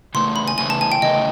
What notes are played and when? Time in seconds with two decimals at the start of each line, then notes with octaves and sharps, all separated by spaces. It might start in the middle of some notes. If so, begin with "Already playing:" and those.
0.14 C#3 E3 A3 C6
0.36 B5
0.48 G#5
0.58 C#3 E3 A3 G#5
0.70 A5
0.81 G#5
0.92 G5
1.02 C#3 E3 A3 D#5